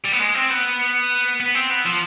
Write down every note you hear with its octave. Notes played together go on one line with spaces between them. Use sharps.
G3
B3
G#3
C4
B3
B3
C4
B3
F3